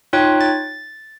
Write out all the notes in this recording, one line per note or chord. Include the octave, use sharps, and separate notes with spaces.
D#4 F4 C#5 G5 F#6
A6